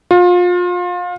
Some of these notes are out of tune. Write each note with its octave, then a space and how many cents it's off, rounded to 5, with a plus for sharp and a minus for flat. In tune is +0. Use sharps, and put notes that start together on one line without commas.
F4 +30